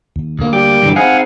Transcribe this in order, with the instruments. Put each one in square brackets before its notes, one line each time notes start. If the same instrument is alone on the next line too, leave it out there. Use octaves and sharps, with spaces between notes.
[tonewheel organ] D#2
[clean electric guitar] D2 A#3
[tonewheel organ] G3 G5 D6
[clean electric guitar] G2 D3 E3
[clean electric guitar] C4 D#4 G#4 [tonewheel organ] F5 F#5 G#5